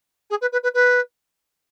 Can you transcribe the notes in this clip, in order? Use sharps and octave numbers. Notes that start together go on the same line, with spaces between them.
G#4
B4
B4
B4
B4